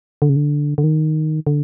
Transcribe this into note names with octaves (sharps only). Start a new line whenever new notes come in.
D3
C#3
D3
D3
D#3
D3